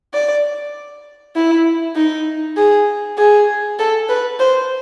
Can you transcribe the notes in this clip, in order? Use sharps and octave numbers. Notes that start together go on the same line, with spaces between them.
D5
E4
D#4
G#4
G#4
A4
B4
C5